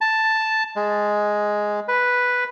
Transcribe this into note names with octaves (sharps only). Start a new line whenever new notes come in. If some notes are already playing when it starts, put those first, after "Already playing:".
A5
G#3
B4